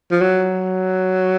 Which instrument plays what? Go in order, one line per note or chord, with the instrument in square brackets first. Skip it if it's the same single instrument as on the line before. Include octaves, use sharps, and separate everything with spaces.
[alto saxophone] F3
F#3